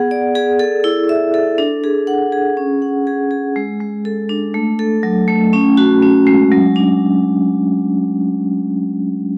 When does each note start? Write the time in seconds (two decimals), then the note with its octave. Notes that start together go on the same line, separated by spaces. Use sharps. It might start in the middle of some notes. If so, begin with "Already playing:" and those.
Already playing: B3 G#4 F#5
0.11 D5
0.35 G#4
0.59 A4
0.84 E4
1.09 E5
1.34 A4
1.58 D4
1.84 G#4
2.07 F#5
2.32 G#4
2.57 C#4
2.82 F#5
3.07 G#4
3.31 G#4
3.56 G#3
3.81 G#3
4.05 A4
4.29 D4
4.54 A3
4.79 A4
5.03 F#3
5.28 A3
5.53 C#4
5.77 F#4
6.03 C#4
6.27 G#3
6.52 F#3
6.76 D4